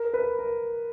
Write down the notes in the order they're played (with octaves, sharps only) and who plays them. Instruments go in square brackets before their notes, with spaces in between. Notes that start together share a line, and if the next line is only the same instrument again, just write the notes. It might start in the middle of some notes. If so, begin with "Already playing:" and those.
Already playing: [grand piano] A#4
B4
A#4